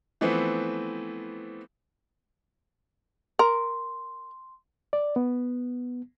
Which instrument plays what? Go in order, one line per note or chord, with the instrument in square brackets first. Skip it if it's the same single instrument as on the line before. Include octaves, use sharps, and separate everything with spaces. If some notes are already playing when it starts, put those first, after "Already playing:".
[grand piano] E3 F3 A3 B3 C4
[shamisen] A#4 [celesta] C6
[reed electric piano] D5
B3